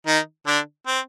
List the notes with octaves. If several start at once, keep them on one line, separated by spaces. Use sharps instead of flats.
D#3 D#4
D3 D4
C4